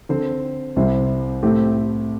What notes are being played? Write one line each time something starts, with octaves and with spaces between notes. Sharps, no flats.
D3 C4 A4 C5
C2 C3 G3 E4 C5
A2 A3 C4 G4